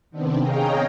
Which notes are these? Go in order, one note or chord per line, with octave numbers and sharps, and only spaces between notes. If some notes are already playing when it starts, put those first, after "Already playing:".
C3 D#3 B3 C4 D4
G#4 C#5 D#5 F5 G5 A#5